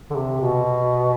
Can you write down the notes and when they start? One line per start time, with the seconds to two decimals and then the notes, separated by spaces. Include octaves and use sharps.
0.10 D3
0.16 C3
0.41 B2